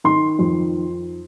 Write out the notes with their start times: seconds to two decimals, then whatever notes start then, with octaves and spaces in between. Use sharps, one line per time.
0.04 D#3 C6
0.39 F2